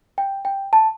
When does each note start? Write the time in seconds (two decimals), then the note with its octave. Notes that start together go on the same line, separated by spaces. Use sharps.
0.18 G5
0.45 G5
0.73 A5